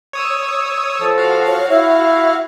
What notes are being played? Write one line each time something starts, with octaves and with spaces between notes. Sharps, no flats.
C#5 D#6 E6
F3 A4
F#4 F5
C#5
E4 E5